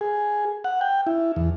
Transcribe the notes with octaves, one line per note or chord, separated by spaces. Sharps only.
G#4
F#5
G5
E4
E2